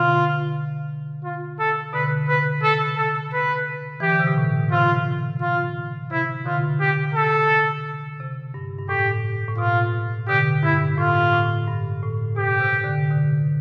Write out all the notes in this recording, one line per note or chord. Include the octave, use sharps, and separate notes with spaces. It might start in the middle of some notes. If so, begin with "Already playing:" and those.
Already playing: B2 D3 F4
F4
A4
B2 D3 B4
C3 B4
A4
A4
B4
E3 G4
D3
C3
B2
A2
C3 F4
F4
C3 E4
B2 D3 F4
G4
A4
C3
G2
G2
A2 G4
A2
B2 F4
B2 D3 G4
G2 E4
A2 F4
A2
G2
A2
B2 G4
C3
D3
C3
B2 D3